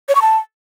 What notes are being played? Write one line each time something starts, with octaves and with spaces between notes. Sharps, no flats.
C#5
C#6
A5